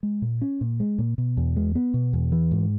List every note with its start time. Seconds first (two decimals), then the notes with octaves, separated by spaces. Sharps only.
0.03 G#3
0.22 A#2
0.42 C#4
0.61 A#2
0.80 G#3
0.98 A#2
1.18 B2
1.37 E2
1.56 G#3
1.75 B3
1.94 B2
2.13 E2
2.32 E3
2.51 G#2